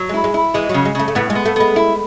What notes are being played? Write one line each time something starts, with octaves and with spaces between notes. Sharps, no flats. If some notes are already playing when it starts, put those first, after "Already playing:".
Already playing: F#3
G#3 E4
G#3
E4
E3 G#3
C#3 F#3
G#3
C#3 A3
A3
A2 B3
G#3
B3
A3
G#3 B3
E4